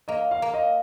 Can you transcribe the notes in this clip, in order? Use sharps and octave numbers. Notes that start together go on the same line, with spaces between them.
A#3 D#5
F5
A#3
D#5